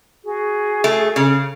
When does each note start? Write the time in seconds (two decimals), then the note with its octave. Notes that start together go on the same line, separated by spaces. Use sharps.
0.22 F#4 G#4
0.84 A3
1.16 C#3